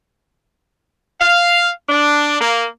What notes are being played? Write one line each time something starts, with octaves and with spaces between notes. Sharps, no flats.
F5
D4
A#3